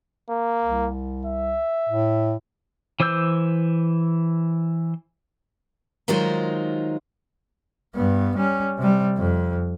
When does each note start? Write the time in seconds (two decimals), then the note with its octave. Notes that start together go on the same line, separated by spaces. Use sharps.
0.30 A#3
0.62 C2
1.25 E5
1.89 A2
3.00 E3 C5 D6 E6 G6
6.08 D#3 F#3 G#3 D#4 F4 C5
7.95 G2 B3
8.36 G3 C#4
8.78 C3 G3
9.18 F2